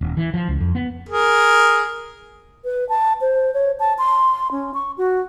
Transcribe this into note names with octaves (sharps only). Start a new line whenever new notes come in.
D#1
E3
F3
C#2
F2
B3
G#4 A#4
B4
A5
C5
C#5
A5
C6
C#4
C#6
F#4